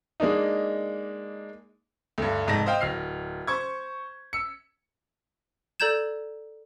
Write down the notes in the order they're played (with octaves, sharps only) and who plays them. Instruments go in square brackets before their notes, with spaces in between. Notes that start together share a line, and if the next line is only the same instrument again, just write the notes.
[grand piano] G#3 A#3 D4 D#4
D2 G2
F1 G#2 A5 A#6
C5 D#5 F5 G5
D1 F6 C7
C5 C#6 G#6
E6 C#7
[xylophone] A4 D5 A#5 G6 G#6 E7